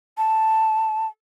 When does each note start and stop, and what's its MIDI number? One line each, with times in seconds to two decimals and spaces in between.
0.18 1.07 81